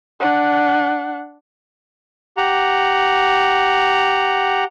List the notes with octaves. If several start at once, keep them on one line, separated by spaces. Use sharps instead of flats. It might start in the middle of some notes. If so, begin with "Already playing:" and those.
D4 F#5
G4 F#5 A#5